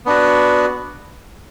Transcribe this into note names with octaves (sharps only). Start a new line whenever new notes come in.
B3 D4 F#4